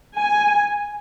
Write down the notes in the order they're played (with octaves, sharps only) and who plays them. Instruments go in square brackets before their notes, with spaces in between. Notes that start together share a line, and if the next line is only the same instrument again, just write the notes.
[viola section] G#5